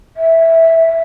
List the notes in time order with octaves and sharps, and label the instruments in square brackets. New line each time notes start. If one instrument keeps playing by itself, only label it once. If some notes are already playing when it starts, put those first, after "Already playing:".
[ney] E5